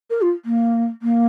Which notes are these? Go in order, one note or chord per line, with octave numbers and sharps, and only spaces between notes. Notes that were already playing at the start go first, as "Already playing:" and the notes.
A#4
F4
A#3
A#3